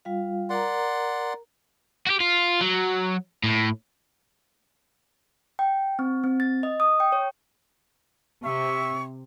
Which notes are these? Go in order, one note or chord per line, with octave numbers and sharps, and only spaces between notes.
G3 F4 F5
A#4 D5 F#5 A#5 C6
F#4 G4
F4
F#3
A2
G5
C4
C4
A6
D#5
D#6
G5
C#5
C3 E5 C#6